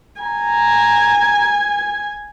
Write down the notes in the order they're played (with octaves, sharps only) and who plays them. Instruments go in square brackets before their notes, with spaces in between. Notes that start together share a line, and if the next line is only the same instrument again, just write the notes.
[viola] G#5 [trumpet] A#5